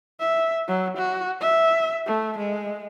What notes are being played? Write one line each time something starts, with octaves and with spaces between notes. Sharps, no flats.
E5
F#3
F#4
E5
A3
G#3